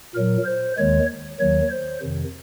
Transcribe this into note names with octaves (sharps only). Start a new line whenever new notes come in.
A#2 F#3 A#4
C5
D#2 D#3 G#3 C#5
D#2 D#3 F#3 C#5
C5
F2 C3 D#3